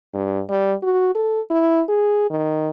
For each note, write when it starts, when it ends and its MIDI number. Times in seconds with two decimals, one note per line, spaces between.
0.14 0.42 43
0.49 0.73 55
0.83 1.14 66
1.15 1.41 69
1.51 1.82 64
1.89 2.26 68
2.30 2.70 51